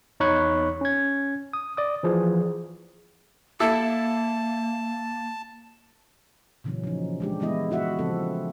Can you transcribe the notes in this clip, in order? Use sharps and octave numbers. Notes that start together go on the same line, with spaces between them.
E2 D#4 C#5 B5 C#6 F#6
C#4 G#6
D#6
D5 D#6
E3 F3 G#4
A#3 E4 A4 A5
A#2 C#3 E3 F#3 C#4
F3 D#4
G#3 D4 G4
E3 G3 G#3 B3 E4 D#5
E4 F#4 E5 F#5
C#3 F3 C4 A4